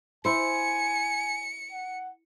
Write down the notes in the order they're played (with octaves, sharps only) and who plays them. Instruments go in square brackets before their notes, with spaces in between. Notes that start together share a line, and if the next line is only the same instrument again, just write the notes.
[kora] E4 C5 [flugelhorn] G#5 [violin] C#7
[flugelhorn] F#5